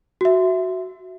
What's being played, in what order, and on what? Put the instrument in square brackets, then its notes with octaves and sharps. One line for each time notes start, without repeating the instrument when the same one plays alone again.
[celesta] F#4 E5